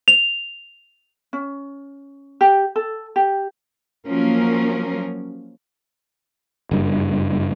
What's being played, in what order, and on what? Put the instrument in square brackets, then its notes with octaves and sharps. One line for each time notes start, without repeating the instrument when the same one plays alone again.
[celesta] F7
[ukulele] C#4
G4
A4
G4
[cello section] F3 F#3 A#3 C#4 A#4
[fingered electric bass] F#1 G2